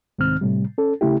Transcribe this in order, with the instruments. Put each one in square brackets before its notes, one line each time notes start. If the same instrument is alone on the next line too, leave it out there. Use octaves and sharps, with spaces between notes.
[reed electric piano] C2 G#2 D#3 C4 F6
A2 C3 G3
C#4 A4
C#3 A3 E4 G4